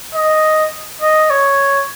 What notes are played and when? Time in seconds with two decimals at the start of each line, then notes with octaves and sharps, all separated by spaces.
0.15 D#5
1.02 D#5
1.30 C#5